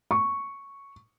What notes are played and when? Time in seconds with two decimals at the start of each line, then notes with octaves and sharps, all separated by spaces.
0.11 C#6